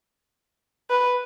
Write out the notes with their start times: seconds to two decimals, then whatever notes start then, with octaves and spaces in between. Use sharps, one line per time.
0.90 B4